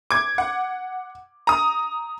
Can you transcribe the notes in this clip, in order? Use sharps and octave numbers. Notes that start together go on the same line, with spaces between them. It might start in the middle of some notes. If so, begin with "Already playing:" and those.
D6 G#6
F#5
A#5 D#6